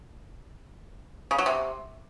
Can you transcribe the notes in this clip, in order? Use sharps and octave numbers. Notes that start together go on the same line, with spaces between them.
C#3
F#3
C3